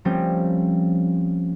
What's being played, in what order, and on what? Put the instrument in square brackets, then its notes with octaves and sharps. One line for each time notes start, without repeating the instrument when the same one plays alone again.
[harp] F3 G3 A3 A#3 C4 C#4